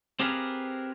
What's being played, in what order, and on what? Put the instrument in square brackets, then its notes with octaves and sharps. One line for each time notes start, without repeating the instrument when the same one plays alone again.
[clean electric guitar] C4 G4 G#4 A#4 B4 F5